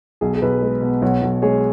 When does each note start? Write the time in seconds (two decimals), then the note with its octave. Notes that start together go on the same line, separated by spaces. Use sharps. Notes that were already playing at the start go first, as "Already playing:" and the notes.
0.21 B1 G#4
0.34 G#4
0.42 B1 B4
0.62 G#3
0.81 B2
1.02 B1 C#5 F#5
1.22 B1
1.42 G#3 G#4 C#5